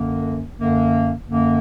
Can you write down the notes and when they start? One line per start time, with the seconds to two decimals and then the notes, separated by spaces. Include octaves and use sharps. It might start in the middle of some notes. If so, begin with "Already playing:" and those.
Already playing: F#2 D3 A#3
0.57 F#2 D3 A#3
1.27 F#2 D3 A#3